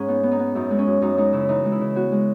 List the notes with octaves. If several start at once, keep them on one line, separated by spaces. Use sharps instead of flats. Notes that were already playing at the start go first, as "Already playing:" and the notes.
Already playing: G#2 C#4 G#4
B3 D#4
B3
D#4
B3
F#2 D#4
G#3
C#4
F#2
F#2 D#4
G#3 D#4
C#3 E4
E3 D#4
G#3
E4
C#3
B3 F#4
G#3